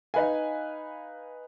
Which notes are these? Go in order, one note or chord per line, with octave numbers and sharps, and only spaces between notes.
D#4 B4 F5 G#5